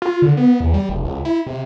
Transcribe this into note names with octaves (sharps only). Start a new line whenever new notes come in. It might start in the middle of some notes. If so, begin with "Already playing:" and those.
F4
D3
B3
E2
G3
F1
C#2
E4
C3